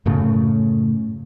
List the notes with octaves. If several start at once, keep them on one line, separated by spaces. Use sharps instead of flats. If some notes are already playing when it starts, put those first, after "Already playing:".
F#2 A2 C#3 A3